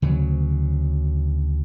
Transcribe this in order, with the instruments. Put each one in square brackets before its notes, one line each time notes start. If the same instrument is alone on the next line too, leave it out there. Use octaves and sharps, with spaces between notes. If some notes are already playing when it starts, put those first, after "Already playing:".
[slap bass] D2 C#3 F#3